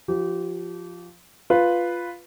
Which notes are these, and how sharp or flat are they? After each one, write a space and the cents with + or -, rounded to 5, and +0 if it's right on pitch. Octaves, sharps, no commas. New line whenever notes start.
F3 +0 G4 -25
F4 +0 B4 +0